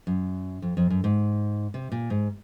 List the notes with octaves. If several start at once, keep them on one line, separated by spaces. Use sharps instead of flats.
F#2
F2
F2
F#2
G#2
C3
A#2
G#2